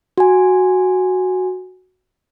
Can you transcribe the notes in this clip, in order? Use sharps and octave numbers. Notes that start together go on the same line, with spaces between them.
F#4 G#5